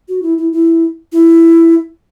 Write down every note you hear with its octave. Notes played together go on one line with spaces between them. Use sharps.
F#4
E4
E4
E4
E4